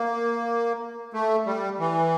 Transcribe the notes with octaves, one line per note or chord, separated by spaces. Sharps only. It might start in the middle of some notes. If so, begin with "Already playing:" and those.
Already playing: A#3
A3
G3
E3